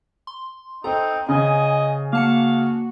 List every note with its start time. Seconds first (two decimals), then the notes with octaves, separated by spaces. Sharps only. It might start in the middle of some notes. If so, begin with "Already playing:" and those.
0.27 C6
0.84 C4 D#4 A4 A#5
1.29 C#3 D#5 G#5
2.13 A#3 F#4 F5 A5 C#7